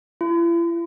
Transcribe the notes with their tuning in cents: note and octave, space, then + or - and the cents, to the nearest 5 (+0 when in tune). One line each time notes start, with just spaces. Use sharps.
E4 +45